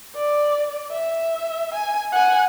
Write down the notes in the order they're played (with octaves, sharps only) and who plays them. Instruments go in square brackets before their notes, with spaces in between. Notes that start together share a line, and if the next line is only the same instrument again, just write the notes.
[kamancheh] D5
E5
G#5
F#5 G#5